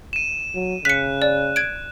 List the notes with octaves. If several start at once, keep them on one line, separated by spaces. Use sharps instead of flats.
D#7 E7
F#3
C#3 F#6 B6 C#7
D5
G#6 D7